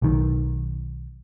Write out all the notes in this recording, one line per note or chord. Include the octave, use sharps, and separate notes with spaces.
B1 D#3